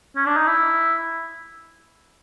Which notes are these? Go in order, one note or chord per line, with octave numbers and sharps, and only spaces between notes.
C#4
D4
D#4
E4